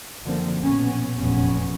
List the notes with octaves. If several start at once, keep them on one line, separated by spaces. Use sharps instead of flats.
F#1 F#2 D3 F3 A#3 C4
A#1 B2 B3 C#4
F1 A#1 E2 B3 C#4